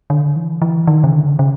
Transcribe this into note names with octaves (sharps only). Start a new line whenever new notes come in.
D3
E3
E3
D#3
C#3
D3
C#3